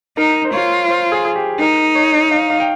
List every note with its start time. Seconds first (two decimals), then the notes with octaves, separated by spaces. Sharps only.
0.17 D#4 A#4
0.45 C5
0.52 F4 C#5
0.88 C5
1.12 G#4
1.25 G#4
1.36 G4
1.60 D#4 A#4
1.95 C#5
2.31 F5
2.50 F5
2.60 G5